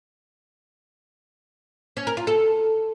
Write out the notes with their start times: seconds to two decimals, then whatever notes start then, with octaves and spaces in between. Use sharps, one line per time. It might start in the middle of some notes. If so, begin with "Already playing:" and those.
1.97 C#4
2.07 A#4
2.17 F4
2.27 A4